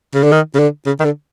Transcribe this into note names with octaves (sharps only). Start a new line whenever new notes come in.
C#3
D3
D#3
C#3
D3
C#3
D#3
D3